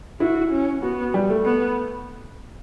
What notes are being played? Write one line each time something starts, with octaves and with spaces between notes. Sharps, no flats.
E4 F#4
C#4
B3 F#4
G3
A3
B3